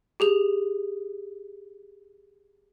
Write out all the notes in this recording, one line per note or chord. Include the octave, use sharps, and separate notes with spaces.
G4 G#4 F7